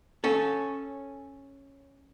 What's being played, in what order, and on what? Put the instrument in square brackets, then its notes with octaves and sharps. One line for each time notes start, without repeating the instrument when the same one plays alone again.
[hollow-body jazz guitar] C#4 A4